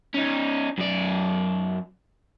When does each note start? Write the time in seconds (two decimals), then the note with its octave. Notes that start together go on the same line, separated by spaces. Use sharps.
0.15 C#4 D#4
0.78 F#2 D5